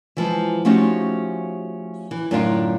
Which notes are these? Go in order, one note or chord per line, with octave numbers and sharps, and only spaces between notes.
E3 F3 G#3
F3 A3 C#4 D#4 F#4 G4
E3
F#2 A2 D3 D4 D#4 F4